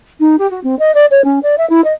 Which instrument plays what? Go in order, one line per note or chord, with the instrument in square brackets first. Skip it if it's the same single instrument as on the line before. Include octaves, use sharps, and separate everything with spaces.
[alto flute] D#4
G4
F#4
C4
D#5
D5
C#5
C#4
D5
E5
E4
D#5